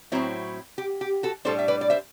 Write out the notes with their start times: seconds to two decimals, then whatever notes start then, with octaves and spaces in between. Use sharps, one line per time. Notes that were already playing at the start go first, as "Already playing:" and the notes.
0.12 A2 F#3 C4 E4
0.78 G4
1.01 G4
1.23 F#4 A4
1.45 A2 G3 D4 A4 C5
1.59 E5
1.68 B4 D5
1.81 D5
1.90 C5 E5